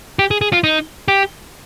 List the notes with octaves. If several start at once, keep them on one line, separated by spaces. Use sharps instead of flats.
G4
G#4
G#4
F4
D#4
G4